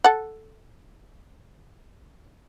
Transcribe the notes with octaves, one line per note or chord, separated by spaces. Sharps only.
A4 F#5